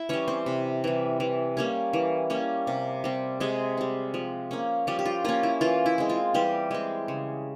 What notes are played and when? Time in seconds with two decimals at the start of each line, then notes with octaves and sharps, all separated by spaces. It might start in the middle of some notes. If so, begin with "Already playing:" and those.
Already playing: E4 E5
0.09 E3 G3 C#4 C#5
0.28 C4 C5
0.46 C3
0.84 E3 G3
1.20 E3
1.57 G3 A#3 C#4
1.93 E3
2.30 G3 A#3 C#4
2.67 C3
3.04 G3 C4
3.40 C3 G#3 G#4
3.77 G3 C4
4.14 F3
4.51 A#3 C#4
4.87 F3 G3 G4
4.99 G4
5.05 F4
5.25 A#3 C#4 F4
5.43 E4
5.61 E3 F4
5.86 E4
5.98 G#3 C4
6.09 F4
6.34 E3 G3 G4
6.71 G#3 C4
7.08 C#3